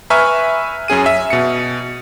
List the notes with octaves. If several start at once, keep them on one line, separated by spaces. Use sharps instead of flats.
B4 E5 G#5 A#5 C#6 F6
F#2 C#4 G#4 D#7
E5
B2 C#7